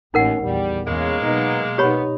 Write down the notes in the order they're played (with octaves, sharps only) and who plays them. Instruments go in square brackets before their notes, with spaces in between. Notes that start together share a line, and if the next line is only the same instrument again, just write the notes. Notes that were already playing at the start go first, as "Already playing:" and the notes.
[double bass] A1 C#4 [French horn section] D#2 [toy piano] D#4 A#4 F#5
[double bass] A#1 E2 [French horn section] G3
[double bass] E2 [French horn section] C#3 [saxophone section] G#3 A#3
[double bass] B2 F#3 [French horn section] B3 D#4
[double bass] B2 D#4 [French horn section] B3 [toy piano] G4 C#5 B5